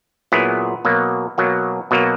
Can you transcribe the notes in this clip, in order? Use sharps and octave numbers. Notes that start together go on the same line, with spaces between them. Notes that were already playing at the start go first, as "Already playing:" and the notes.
A#2 F#3 B3 E4 G#4
B2 F#3 A#3
B2 F#3 A#3
B2 F#3 A#3